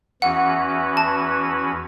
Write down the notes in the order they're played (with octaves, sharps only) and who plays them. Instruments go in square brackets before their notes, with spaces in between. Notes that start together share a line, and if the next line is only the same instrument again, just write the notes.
[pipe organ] E2 E3 C#4 F#4 B4 [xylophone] F#5
[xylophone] A5